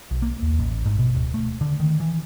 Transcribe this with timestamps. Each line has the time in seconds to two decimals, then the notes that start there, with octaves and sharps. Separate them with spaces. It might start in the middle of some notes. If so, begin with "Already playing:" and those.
0.11 B1
0.22 A#3
0.42 D#2
0.59 A1
0.86 G#2
0.99 B2
1.15 D1
1.34 A3
1.61 D3
1.80 D#3
2.00 E3